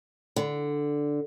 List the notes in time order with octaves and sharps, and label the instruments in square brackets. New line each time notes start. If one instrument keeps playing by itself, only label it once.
[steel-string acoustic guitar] D3